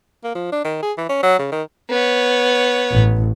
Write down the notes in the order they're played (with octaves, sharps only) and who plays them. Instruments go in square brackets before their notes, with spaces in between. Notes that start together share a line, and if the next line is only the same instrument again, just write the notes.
[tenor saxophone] A#3
F3
D4
D#3
G#4
E3
C#4
F#3
C#3
D#3
[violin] B3 C#5
[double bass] A1